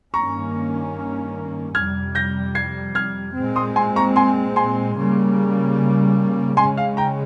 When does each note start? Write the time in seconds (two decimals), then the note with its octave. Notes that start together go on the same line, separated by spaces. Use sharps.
0.14 G2 D#3 A#3 C#4 A#5 C#6
1.75 F2 C3 G3 F6 G#6
2.15 G6 A#6
2.55 G#6 C7
2.95 F6 G#6
3.36 A#2 G#3 C4
3.56 C6 D#6
3.76 G#5 C6
3.96 A#5 C#6
4.16 G#5 C6
4.56 G#5 C6
4.96 C#3 G3 A#3
6.57 C#3 G#3 C#4 G#5 C6
6.77 F5
6.97 G5 A#5